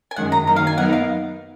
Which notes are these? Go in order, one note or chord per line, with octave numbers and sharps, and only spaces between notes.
G#5
F#2 D#3 G#3 F#5
A#5
D#3 F#3 A#3 D#4 A#5
F5
G#5
F#3 B3 D#4 A#4 F#5
F5